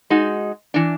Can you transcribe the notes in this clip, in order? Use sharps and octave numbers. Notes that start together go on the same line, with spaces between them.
G#3 D#4 F#4
E3 D4